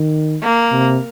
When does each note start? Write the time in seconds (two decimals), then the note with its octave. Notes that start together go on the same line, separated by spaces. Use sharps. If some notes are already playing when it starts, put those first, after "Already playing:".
Already playing: D#3
0.43 A#3
0.72 C3